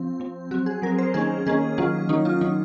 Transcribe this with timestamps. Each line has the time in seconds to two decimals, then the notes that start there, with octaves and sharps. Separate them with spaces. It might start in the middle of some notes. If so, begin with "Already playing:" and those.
Already playing: F3 C4
0.20 F3 C4
0.51 F#3 F#4
0.54 C4
0.66 G#4
0.82 F#3 A#4
0.86 C4
0.98 C5
1.14 D#3 A#3 C#4 G#4
1.46 D#3 A#3 C#4 G#4
1.78 D#3 F#3 A#3 C#4 F4
2.09 D#3 F#3 A#3 C#4 D#4
2.25 F4
2.41 D#3 F#3 C#4 D#4